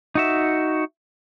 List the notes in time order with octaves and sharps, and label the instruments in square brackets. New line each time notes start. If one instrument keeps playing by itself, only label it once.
[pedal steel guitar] D#4 F#4 E5